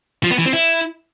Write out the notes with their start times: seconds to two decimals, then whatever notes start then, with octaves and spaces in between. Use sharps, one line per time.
0.24 F3
0.31 B3
0.38 E3
0.46 C4
0.53 E4